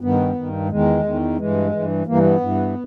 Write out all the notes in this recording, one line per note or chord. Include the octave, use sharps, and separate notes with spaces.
G2 D#3 B3
G2 D#3
E2 D#3 G#3
E2 D#3
G2 E3 G#3
G2 E3
G2 E3 A#3
B3
G2 E3